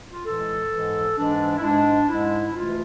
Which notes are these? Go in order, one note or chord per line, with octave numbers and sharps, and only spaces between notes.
F4
A2 E3 G#3 A4
G#2 E3 G#3
G#2 E3 G#3 D4
E4
G#2 G#3 D4
G#2 G#3 E4
D2 C3 E3 A3 F4